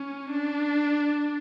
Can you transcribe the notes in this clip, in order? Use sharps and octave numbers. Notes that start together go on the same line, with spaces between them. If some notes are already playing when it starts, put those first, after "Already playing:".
Already playing: C#4
D4